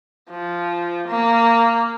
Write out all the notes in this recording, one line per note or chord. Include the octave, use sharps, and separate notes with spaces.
F3
A#3